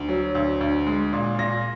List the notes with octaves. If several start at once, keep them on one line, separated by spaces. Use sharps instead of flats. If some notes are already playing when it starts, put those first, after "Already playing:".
Already playing: D2
F#3
D2
D2
G#3
A#2
A#2 A#6